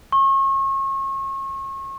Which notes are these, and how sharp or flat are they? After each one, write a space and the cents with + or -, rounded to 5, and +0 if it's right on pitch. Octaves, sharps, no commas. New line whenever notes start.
C#6 -35